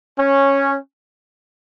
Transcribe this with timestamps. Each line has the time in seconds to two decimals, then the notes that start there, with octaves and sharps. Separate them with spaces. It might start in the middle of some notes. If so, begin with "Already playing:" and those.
0.18 C#4